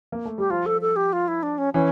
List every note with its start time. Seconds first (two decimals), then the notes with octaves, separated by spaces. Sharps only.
0.12 A#3
0.25 A3
0.38 G3 G4
0.50 F3 F4
0.66 A4
0.81 A4
0.96 G4
1.13 F4
1.28 E4
1.43 D4
1.58 C#4
1.74 E3 C#4